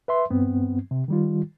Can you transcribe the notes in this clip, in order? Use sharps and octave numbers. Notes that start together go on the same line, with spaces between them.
B4 E5 C6
G2 B3 C4
C3
D#3 G3 F4